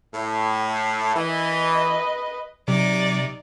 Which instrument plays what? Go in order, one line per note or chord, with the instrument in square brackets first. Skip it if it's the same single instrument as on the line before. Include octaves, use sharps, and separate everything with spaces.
[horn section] A2
[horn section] E3 [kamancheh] B4 D#5
[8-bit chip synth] C3 [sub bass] F#3 [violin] D#4 D5